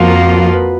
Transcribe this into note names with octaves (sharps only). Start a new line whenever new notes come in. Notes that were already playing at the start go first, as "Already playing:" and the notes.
Already playing: F2 F3 A#3 F4 F#4
A#4
B4
A#4
B4